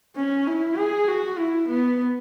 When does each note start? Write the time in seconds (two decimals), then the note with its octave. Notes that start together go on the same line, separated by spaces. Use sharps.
0.16 C#4
0.47 E4
0.77 G#4
1.08 F#4
1.38 E4
1.68 B3